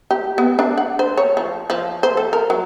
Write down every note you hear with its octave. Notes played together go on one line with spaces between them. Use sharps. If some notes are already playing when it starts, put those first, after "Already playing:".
G4
B3
D4
F#5
C5
C#5
F3
F3
C5
A4
A#4
F#3